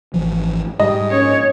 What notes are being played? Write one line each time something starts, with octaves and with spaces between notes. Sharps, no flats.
G#1 E3 F3
G#2 G3 D#5
A#1 A#2 C#4 C#5